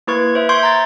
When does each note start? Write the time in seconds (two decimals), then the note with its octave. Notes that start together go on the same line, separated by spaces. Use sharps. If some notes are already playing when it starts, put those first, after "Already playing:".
0.07 A#3 E4 B4 C#6 G#6
0.35 C5 E5
0.49 E5 C6 C#6 G6 G#6 D7
0.63 A#5 A6